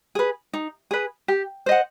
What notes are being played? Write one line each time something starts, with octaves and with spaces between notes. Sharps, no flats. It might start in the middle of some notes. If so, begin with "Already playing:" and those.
G#4 B4
D#4
G#4 B4
G4
C5 D#5 F#5